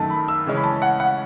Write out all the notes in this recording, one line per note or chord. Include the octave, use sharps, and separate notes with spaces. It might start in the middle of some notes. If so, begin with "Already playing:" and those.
Already playing: F#2 D#3 A3 A5
B5
E6
C#3 E3 G#3 C#4
B5
A5
F#5
F#5